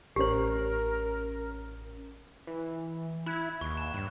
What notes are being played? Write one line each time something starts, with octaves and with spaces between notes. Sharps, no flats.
A1 C#4 G4 A#4 C5
E3
E4 B5 F#6 G#6
D#2 C#6
E7
G2 F#6